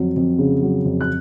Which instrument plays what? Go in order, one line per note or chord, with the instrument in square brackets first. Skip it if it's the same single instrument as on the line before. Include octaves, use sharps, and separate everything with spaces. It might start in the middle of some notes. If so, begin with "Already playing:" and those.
Already playing: [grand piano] F2 F#3
F2
C#3
F#3
F2
F#6